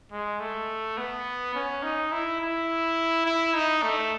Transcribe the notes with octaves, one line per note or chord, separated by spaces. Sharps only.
G#3
A3
B3
C#4
D#4
E4
E4
E4
D#4
A3